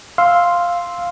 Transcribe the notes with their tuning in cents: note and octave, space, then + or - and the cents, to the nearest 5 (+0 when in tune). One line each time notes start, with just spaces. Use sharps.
F5 +0 C6 +0 E6 +0